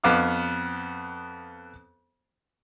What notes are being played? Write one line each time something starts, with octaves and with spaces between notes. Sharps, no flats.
F2 B3 F5 D6 F6